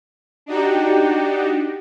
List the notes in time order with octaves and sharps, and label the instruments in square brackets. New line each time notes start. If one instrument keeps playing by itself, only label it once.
[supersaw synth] D4 D#4 F#4 G4